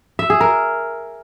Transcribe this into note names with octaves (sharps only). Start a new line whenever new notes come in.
E5
G#4
A#4